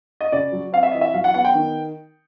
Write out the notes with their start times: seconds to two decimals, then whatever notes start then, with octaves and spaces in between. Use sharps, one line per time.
0.21 D#5
0.32 C#3 D5
0.52 F#3
0.72 C4 F5
0.83 E5
0.91 E3 D#5
1.01 E5
1.14 F#3 F5
1.24 F#5
1.34 B3 F#5
1.45 G5
1.55 D#3